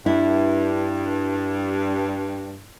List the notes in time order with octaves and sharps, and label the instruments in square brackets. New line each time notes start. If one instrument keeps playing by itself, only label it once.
[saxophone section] G2 [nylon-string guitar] E4